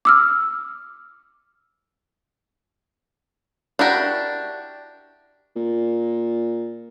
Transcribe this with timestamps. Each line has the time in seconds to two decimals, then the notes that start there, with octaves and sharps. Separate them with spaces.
0.05 D6 E6 F6
3.79 D4 E4 F#4 G4 A#4
5.56 A#2